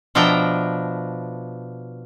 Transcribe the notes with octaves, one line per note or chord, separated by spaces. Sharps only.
B2 F3 D4 E5 G5 A#5